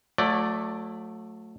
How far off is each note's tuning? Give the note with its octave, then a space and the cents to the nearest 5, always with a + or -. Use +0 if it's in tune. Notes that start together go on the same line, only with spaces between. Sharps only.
F#3 -35 A3 +0 D5 +0